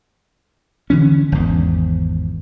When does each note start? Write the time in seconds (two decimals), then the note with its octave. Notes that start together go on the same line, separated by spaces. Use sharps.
0.90 D3 E3 C#4
1.32 G#1 E2